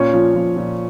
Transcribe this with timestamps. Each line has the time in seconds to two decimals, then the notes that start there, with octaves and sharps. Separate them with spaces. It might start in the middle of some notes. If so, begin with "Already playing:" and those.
Already playing: A#2 C#4 C#5
0.14 F3
0.36 F3
0.57 A#2